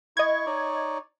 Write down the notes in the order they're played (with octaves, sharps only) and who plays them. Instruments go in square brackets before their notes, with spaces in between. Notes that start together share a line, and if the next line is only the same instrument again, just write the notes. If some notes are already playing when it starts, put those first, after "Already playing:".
[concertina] E4 C#6 [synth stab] D#5 G#6
[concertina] D#4 C#5 D5